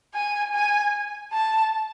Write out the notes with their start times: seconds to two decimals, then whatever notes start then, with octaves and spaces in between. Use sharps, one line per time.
0.14 G#5
0.54 G#5
1.33 A5